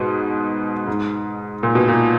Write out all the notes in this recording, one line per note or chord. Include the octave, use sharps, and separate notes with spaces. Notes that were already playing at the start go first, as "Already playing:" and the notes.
Already playing: G#2 B2
G#2
A#2
B2
A#2